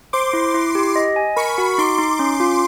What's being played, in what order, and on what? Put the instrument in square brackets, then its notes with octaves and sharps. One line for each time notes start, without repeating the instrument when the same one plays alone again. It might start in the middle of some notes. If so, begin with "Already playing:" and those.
[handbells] C5 [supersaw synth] C6 D6
[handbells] E4
E4
G4
D#5
G#5
[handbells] A#4 [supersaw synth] B5 C#6
[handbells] F#4
[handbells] D#4 [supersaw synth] C6 D6
[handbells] D#4
C#4
F4